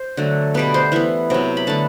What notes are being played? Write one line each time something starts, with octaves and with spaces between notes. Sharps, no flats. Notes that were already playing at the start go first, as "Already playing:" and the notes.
Already playing: C5
D3 F#3 A3
B2 G3 B3 B4
C5
E3 B3 E5
C3 F#3 B3
B5
D3 A3 A5